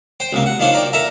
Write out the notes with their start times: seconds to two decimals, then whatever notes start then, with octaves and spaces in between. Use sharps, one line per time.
0.20 C5 G5
0.33 C#2 C3 A#3
0.46 F#5
0.60 D#3 A#3 D4 F4 C5 C#5
0.74 A#4 D5 G5
0.93 A4 A#4 E5 A5 A#5